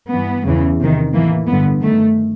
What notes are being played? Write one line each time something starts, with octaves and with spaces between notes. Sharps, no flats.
G2 E3 B3
E2 C#3 E3
E2 C3 D#3
A2 E3 A#3
G2 D3 B3
G2 D#3 A3